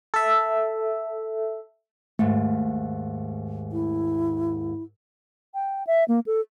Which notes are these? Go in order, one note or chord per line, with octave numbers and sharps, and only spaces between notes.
A4 E5
D#2 G#2 A3
E4
G5
E5
A#3
A4